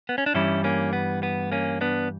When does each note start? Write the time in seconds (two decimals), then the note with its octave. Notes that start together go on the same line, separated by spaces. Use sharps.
0.09 B3
0.18 C#4
0.26 D4
0.34 G2 E3 G3 C#4 E4
0.64 A#3 C#4
0.93 B3
1.23 B3
1.52 A#3 C#4
1.81 B3 D4